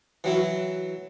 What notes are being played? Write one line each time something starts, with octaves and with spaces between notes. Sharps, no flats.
E3 F#3 E4